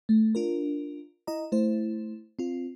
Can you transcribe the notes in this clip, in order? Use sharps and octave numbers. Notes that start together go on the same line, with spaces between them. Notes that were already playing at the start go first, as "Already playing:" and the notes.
A3
D4 F4 A#4
E4 D#5 A#5
A3 E4 C5
C4 F4